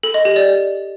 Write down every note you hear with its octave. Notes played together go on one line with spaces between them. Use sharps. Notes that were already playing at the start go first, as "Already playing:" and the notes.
A4
D#5
G4
D5